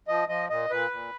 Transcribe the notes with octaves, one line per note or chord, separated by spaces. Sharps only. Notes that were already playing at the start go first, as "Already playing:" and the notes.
F3 D#5
F3 D#5
A#2 D#5
A#2 B4
A#2